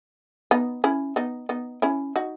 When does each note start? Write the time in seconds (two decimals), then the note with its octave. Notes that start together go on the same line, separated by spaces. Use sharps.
0.51 B3 D#4
0.84 C#4 E4
1.16 B3 D#4
1.49 B3 D#4
1.82 C#4 E4
2.16 D#4 F#4